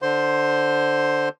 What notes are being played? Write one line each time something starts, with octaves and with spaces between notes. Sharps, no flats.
D3 C5 C6